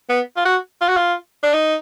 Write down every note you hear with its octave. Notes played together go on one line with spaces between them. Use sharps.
B3
F4
F#4
F4
F#4
F4
D4
D#4